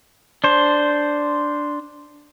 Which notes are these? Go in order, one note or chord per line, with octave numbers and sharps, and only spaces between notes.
D4 C5